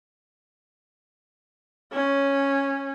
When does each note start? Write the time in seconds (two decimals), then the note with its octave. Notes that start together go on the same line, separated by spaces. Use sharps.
1.93 C#4